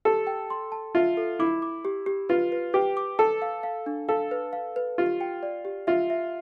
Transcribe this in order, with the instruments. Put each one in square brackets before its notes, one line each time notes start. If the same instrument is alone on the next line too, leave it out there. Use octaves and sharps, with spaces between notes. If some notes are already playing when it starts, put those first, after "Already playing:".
[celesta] G4 [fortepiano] A4
[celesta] G5
C6
A5
[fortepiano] F4 [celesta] E5
[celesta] A4
[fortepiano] E4 [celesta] D6
[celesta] D6
G4
G4
[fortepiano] F4 [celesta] B4
[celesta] B4
[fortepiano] G4 [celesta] B4
[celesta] D6
[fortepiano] A4 [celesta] A5
[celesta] F5
F5
D4
[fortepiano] A4 [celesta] F5
[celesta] B4
F5
B4
[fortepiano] F4 [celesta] G4
[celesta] G5
D5
G4
[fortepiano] F4 [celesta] E5
[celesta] E5